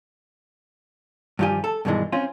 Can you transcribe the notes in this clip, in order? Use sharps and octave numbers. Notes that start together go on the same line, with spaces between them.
G2 D#3 F3 F4 G4 G#5
A4
G2 B2 D#3 E3 G#3 D4
C4 C#4 F4